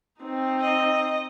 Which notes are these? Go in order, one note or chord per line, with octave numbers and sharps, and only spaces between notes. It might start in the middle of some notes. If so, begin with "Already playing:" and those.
C4 D#4
D#5